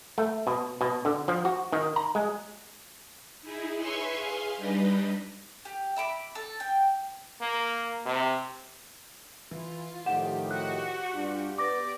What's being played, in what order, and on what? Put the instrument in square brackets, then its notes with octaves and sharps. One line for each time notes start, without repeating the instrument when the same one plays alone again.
[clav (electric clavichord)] A3
B2
B2
D3
F3
F#4
D#3
A#5
G#3
[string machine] D#4 E4 G#4
B4 C#5 E5 G#5 C6 C#6
G#4 F5 G#5 C6
G3 D4 D#4 G4 B4 D#5
[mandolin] G4
E5 B5 D6
A4
G5
[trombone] A#3
C3
[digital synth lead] E3 [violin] F4
[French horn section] A2 D#3 F3 [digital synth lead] G4 [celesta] F#5 E7
[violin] F#4 [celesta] F#6
[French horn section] G2 D4 F4
[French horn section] B3 [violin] D5 [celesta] D6 A#6